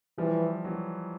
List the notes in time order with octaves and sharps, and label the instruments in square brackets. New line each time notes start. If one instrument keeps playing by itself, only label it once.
[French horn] E3 [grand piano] F3 G3
[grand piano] E3 F#3